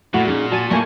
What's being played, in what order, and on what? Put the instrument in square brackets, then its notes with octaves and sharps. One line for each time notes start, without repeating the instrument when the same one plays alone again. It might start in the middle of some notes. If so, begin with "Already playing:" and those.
[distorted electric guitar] A#2 [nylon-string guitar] A3 E4 F#5 [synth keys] F#4
[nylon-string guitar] C#4 D#4 G#4
[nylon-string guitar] F#4 C#5 G#5 [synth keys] A5 D#7
[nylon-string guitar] G3 E4 [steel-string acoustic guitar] A3 A#3 A5 [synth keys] G#5 C#6